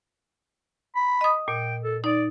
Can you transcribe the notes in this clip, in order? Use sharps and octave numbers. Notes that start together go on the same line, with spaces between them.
B5
D#5 D#6
A#2 G5
A4
D#4 D5